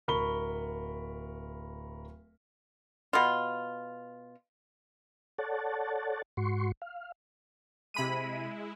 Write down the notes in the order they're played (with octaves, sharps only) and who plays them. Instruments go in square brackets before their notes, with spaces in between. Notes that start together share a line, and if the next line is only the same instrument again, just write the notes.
[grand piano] D1 A#4 B5 C#6 G7
[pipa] B2 F4
[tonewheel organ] A4 C#5 D5 F#5 A5
G#2 F#4 C6 C#6
F5
[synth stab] C3 B5 D#7 [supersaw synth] G#3 E4